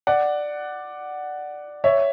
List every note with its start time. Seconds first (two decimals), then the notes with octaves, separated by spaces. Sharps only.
0.07 D5 F#5
1.84 C#5 E5